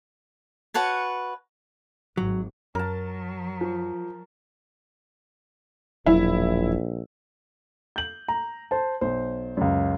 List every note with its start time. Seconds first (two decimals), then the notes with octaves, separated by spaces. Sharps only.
0.74 F#4 B4 C#5 A5
2.17 G#1 F#3
2.75 F#2 F#3 A#4 A5
3.61 F3
6.06 E1 A#1 F#3 E4
7.96 G6 F#7
8.28 A#5
8.71 C5 A5
9.01 B1 C5
9.57 C#2 F#2